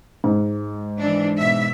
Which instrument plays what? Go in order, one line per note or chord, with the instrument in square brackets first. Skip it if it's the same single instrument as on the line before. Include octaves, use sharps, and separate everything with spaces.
[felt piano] G#2
[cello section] E3 D4
B2 E5